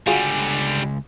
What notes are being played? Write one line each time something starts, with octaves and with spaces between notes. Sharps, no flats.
C#2 D3 G3 F4 F#4 G#4 G#5